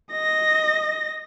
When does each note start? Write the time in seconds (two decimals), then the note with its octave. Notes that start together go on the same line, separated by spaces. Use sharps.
0.12 D#5 A#6